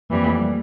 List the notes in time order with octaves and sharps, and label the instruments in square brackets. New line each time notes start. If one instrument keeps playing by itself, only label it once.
[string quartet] F2 E3 G3 [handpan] A#3
[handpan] A3
G3